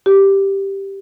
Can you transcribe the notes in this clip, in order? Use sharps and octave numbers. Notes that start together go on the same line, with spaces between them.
G4